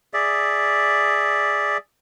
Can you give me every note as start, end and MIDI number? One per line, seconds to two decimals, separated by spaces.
0.14 1.77 68
0.14 1.77 74
0.14 1.77 76